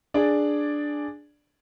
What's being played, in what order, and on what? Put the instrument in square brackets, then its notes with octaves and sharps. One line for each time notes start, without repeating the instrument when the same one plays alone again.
[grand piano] D4 G#4 D5